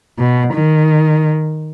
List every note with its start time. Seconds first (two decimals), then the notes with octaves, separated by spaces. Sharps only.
0.19 B2
0.53 D#3